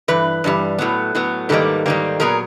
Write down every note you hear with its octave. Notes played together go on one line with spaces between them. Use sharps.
G2 E3 B4
G2 E3 G3
A2 F#3 B3
A2 F#3 B3
G#2 D#3 G3 A#3 A4 B4
G#2 D#3 G3 A#3
A#2 F#3 B3 G#4 A#4